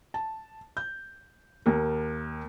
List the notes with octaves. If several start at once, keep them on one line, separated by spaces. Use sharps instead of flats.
A5
G6
D#2 A#4